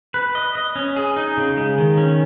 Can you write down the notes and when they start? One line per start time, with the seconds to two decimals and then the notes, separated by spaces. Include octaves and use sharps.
0.14 B4
0.35 D#5
0.55 D#5
0.76 C#4
0.96 G#4
1.16 D#4
1.37 C#3
1.57 G#3
1.78 D#3
1.98 C#4